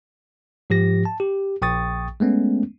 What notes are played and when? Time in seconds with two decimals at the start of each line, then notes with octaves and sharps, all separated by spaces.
0.70 G#2 F3 G4 A#6
1.05 A5
1.20 G4
1.62 A#1 G5 C#6 D#6 A6
2.20 G#3 A3 B3 C#4